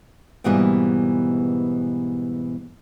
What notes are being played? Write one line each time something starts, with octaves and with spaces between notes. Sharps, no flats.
G#2 B2 E3 G3 A#3 B3